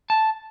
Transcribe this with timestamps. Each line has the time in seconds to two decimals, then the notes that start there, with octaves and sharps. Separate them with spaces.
0.10 A5